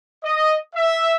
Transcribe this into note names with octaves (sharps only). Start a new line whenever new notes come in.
D#5
E5